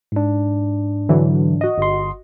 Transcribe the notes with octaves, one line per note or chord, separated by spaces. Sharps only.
G#2 D4
D3 E3 F#3
F#4 D#5
G1 C6